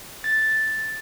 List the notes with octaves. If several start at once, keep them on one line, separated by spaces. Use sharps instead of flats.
A6